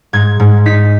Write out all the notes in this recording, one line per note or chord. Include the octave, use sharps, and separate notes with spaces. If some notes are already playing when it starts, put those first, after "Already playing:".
G#2 G#6
G#2
D#4 B6